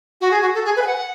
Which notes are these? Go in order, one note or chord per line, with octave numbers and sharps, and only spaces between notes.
F#4
G#4
F#4
A4
G#4
B4
G#5
F#5